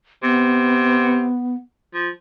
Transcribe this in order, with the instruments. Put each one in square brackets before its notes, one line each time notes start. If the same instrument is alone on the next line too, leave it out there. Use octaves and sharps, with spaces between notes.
[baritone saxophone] C3 [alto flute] B3
[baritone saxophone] F3